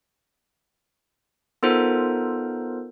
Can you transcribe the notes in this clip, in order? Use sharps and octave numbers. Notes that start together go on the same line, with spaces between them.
B3 D#4 F4 A4 A#4 C5